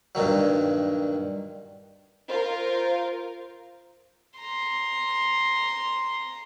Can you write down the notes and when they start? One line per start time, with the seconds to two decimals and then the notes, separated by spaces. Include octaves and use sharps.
0.15 G2 A#2 D#3 F#3
2.29 F4 A#4 C5
4.39 A#5 C6